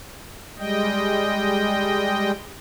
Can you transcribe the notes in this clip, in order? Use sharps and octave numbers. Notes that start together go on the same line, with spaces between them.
G3 G#3 D#5 G5